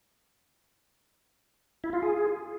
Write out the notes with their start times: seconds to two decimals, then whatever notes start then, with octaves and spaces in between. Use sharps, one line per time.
1.84 E4
1.93 F4
2.02 G#4